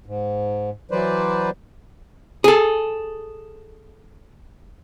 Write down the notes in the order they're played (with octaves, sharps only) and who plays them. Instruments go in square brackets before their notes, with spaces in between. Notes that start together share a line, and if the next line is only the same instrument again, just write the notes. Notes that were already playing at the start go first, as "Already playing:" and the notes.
[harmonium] G#2
E3 F#3 B4 C5 D5
[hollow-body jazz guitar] G#4 A4